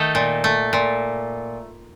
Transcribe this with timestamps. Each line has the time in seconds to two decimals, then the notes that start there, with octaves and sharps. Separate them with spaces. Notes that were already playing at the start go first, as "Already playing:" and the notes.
Already playing: D#3 A3 D#4 A4
0.15 A#2
0.44 A3
0.73 A#2